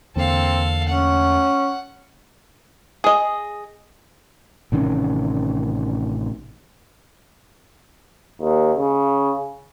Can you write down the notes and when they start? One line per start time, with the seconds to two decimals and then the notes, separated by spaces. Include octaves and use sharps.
0.16 E2 D3 A#3 C4 A4 F5
0.88 A3 C#4 F#5
3.04 G#4 D#5
4.72 A1 C3 D#3 C#4
8.42 D#2
8.77 C#3